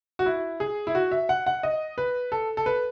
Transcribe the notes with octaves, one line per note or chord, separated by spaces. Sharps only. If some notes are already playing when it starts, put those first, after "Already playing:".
F#4
E4
G#4
E4
F#4
E5
F#5
F#5
D#5
B4
A4
A4
B4